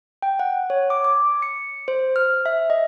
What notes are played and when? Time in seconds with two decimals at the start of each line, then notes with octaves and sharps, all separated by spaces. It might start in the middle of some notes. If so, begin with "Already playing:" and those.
0.22 G5
0.39 F#5
0.70 C#5
0.90 D6
1.04 D6
1.42 C#7
1.88 C5
2.16 F6
2.46 E5
2.70 D#5